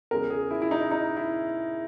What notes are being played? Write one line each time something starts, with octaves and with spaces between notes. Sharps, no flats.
E2 C#3 G#3 A#4
G#4
E4
E4
D#4
D#4
E4